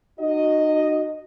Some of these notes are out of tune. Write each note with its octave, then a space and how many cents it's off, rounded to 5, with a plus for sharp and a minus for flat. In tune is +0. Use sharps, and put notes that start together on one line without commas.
D#4 -35 F#4 +5 D#5 +0